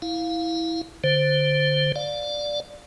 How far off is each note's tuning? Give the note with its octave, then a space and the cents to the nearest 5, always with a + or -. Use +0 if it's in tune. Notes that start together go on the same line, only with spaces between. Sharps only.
E4 -10 F5 +5
D3 +0 C5 +0
D5 +0 F5 +20